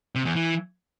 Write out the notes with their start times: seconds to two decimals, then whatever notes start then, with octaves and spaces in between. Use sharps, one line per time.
0.15 C3
0.25 E2
0.36 E3